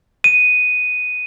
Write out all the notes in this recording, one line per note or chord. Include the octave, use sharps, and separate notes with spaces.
D#7